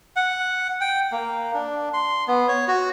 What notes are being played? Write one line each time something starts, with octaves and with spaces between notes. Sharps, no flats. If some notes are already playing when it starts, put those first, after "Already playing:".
F#5
G5
A#3
D4
C6
B3
C#5
F#4